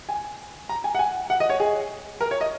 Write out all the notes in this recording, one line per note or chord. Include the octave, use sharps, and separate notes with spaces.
G#5
A#5
G#5
F#5
G#5
F#5
D#5
C#5
G#4
A#4
C#5
D#5